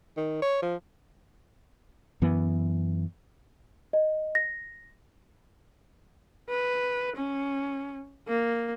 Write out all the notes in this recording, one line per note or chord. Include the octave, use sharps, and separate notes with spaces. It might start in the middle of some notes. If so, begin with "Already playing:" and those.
D#3
C#5
F3
F#2 E3 B3
D#5
A#6
B4
C#4
A#3